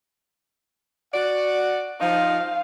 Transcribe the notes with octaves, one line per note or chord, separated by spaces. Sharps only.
F#4 D5 F#5
F3 D#4 F5